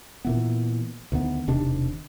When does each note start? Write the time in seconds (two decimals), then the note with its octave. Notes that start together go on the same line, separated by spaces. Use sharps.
0.25 A#2 E3 B3
1.12 D2 D#3 B3
1.47 E1 C3 D#3 D4